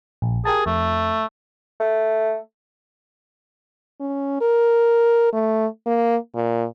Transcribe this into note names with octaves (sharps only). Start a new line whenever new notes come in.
A#1
G4 G#4 A#4 A5
F2 A3
A3
C#4
A#4
A3
A#3
A#2